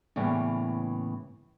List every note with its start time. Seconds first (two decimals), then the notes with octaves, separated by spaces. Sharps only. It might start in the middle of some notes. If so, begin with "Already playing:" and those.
0.16 A2 C#3 E3 G3 A#3 B3